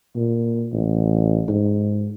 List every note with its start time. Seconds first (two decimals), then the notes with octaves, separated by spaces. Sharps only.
0.16 A#2
0.73 A1
1.49 G#2